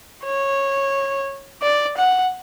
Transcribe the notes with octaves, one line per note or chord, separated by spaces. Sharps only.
C#5
D5
F#5